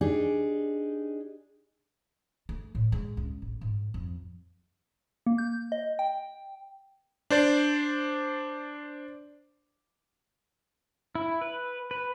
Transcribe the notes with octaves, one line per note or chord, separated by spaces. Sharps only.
D4 D#4 G4 G#4
A3
A2
G#3
C#2
A1
G#2
F2
A#3
G6
D#5
G5
D4 C5 D5
E4
B4
B4